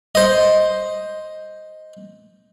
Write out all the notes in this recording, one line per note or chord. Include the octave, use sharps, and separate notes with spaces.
C5 D#5